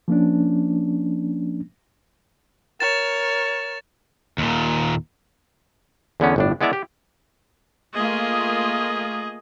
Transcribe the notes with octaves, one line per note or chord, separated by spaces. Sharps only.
F3 A#3 C#4 D4
A#4 C#5 A6 E7
D#2 A#2
E2 D3 B3 C#4
G1 A2 D4
G#3 B3 E4 D5 E5 A#5
G4
A3 A#3 F4 G#4 D#5